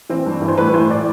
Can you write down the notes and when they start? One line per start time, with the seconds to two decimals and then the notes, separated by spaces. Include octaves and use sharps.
0.10 E3 C4
0.26 G2
0.42 E3
0.48 C5
0.58 A2 B4
0.74 E3 C5
0.90 A2 D5